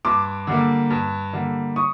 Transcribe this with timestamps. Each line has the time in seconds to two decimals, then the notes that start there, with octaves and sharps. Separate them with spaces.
0.05 G2 C6 D6
0.47 D3 G3 A#3
0.90 G2
1.33 D3 G3 A#3
1.76 C#6 D#6